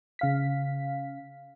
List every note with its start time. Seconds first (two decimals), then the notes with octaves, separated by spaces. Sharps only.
0.19 C#3 F5 B6